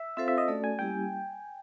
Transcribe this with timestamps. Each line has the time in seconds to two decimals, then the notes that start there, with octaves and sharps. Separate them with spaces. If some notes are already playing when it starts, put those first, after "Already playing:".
Already playing: E5
0.17 C4 F4 A4 C5 E5 F5
0.28 E5
0.38 D#5
0.48 A3 C#4 F#4 A4 D5
0.64 G#5
0.79 G3 A#3 C#4 E4 G4 G5